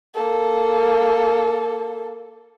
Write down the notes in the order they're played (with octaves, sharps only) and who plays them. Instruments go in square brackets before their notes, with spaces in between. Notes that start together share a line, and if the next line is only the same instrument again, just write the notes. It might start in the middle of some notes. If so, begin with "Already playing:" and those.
[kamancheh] A#3 A4